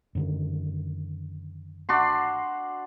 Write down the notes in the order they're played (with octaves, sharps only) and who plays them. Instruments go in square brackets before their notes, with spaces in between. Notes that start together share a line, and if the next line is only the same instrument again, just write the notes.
[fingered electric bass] F#2 D3 D#3
[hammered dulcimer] D4 F#4 C6